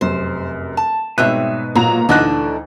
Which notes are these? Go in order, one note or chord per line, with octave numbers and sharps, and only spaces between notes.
F1 F#2 C5
A5
G#2 B2 G3 C4 C#5 E5 F#6 D#7
A#2 F#3 A#5 F7
D2 D3 E3 D4 D#4 A4 D#5 F#6